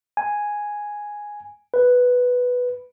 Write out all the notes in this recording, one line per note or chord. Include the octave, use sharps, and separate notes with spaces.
G#5
B4